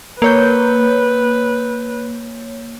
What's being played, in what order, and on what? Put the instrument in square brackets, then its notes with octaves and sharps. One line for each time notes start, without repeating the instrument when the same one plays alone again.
[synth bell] A#3 C#5 G6 [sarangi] B4